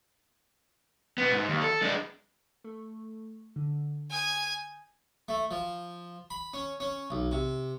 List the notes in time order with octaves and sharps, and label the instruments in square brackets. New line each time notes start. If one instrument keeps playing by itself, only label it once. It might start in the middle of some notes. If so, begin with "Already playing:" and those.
[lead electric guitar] B2 B3
G#2
D#2
A4
G#3 D4
[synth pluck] A3
D3
[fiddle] G#5 [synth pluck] D#6 G6
[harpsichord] A3
F3
B5
C#4
C#4
B1
C3